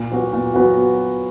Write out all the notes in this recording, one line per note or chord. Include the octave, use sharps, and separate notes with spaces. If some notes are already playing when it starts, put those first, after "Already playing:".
Already playing: A#2
F#3 B3 F#4
A#2
F#3 B3 F#4